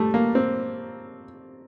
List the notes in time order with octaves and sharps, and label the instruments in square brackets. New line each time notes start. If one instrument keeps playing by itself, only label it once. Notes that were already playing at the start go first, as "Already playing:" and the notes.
Already playing: [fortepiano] G3 A3
A#3
C4